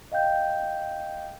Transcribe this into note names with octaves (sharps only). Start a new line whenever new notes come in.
D#5 F5 G5 G6